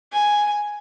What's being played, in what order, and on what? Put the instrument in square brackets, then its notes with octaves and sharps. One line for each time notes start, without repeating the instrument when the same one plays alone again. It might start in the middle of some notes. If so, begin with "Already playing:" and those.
[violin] G#5